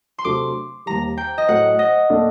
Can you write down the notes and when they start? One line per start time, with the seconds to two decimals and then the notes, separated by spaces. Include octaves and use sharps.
0.18 C6
0.25 C3 F#3 A3 D4 F#4 D6
0.86 D#2 D#3 G3 A#5
1.18 G5
1.38 D#5
1.49 A2 F#3 A3 F#5
1.79 D#5
2.10 A#2 A3 D4